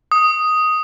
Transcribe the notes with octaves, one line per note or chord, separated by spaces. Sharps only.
D#6